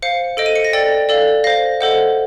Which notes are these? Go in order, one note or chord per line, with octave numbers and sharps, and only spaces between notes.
C5 F5 C#7
A4 C5 D#5 D7
D#7
C#7
A#6
A4 D5 G5 A6
A4 D5 F5
C5 F5 A#6
A4 C5 D#5 F#5